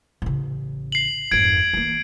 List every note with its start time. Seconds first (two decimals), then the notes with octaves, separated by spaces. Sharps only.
0.22 A1 C#3
0.92 C7 F#7
1.31 G#1 F2 G#6 D7
1.73 E3 A#3